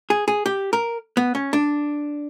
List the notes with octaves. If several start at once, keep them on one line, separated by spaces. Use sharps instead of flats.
G#4
G#4
G4
A#4
B3
C#4
D4